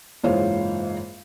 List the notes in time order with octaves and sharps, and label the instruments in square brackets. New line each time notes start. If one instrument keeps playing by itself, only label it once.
[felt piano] F#1 G#2 E3 F4 C5 C#5